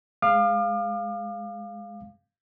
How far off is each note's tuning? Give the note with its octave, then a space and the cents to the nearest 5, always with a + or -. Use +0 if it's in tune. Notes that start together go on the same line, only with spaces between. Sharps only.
G#3 +0 F5 +0 D6 +45